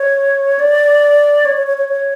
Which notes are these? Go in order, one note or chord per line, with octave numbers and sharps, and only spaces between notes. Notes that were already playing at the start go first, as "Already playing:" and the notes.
Already playing: C#5
D5
C#5
C#5
C#5
C#5
C#5